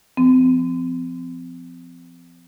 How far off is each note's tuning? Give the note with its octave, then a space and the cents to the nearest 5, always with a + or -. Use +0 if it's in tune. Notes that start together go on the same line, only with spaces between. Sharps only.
F3 -15 C4 -35